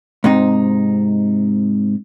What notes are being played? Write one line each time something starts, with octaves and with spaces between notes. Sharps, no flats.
G#2 C3 D#4